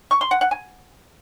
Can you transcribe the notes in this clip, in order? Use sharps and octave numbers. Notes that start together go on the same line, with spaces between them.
C#6
C6
F#5
F#5
G#5